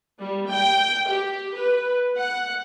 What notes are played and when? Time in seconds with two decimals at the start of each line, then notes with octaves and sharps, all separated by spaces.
0.19 G3
0.49 G5
1.07 G4
1.56 B4
2.17 F#5